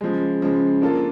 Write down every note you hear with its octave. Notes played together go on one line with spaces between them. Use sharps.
C#3 F3 G#3
C#3 F3 G#3
A#3 D4 F4 A4